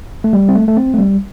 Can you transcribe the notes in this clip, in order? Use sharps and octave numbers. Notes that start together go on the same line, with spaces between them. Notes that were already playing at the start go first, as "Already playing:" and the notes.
A3
G3
C4
A3
A3
C4
A3
G3